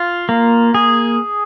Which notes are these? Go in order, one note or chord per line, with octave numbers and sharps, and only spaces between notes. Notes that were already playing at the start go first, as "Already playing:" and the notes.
Already playing: F4
A#3
G#4